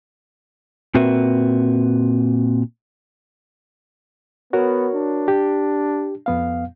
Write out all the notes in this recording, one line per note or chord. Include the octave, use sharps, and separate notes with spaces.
A#2 C4 F#4 A#4 B4 E5
B3 F#4 A#4 C#5
D4
G4
F2 B3 F5